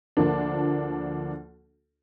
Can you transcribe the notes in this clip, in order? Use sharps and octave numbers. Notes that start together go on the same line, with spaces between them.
D2 F3 A#3 D4